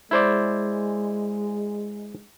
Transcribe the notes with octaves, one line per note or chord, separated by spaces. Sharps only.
G#3 E4 C5 D5